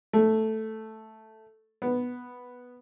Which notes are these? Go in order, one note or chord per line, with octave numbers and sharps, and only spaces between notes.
A3
B3